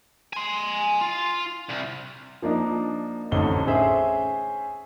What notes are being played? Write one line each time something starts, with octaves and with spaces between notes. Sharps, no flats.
G#5 C6
F4
C2
F3 A#3 D4 D#4
A1 F2 D3 D#4 A4 G7
C#4 G#4 C5 E5